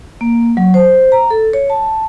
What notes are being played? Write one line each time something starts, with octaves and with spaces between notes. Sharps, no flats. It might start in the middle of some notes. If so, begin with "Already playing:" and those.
A#3
F#3
C5
A#5
A4
C#5
A5